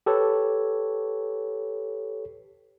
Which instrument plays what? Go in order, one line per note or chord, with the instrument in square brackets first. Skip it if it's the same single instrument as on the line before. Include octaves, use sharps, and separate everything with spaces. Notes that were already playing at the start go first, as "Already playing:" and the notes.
[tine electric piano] G4 A4 B4 C#5